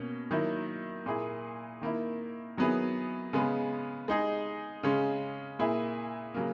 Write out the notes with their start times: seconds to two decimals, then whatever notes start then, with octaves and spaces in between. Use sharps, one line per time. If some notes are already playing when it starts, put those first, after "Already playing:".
Already playing: B2 A#3 C#4
0.31 D#3 F#3 A#3 E4
1.06 A#2 A#3 E4 G#4
1.81 D#3 A#3 E4
2.57 D#3 F#3 B3 E4 G#4
3.33 C#3 G#3 B3
4.08 G#3 D#4 G#4
4.83 C#3 G#3 C#4
5.59 A#2 A#3 E4 G#4
6.34 C#3 F#3 A#3